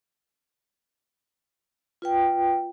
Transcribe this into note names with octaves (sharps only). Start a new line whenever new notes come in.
F4 B4 G5